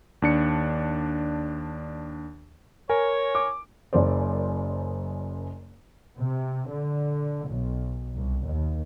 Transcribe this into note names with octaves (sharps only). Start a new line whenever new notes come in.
D#2 D4 C#7
A#4 C#5 G#5
D6
F#1 F#2 C5 D5
C3
D3
B1
C2
D#2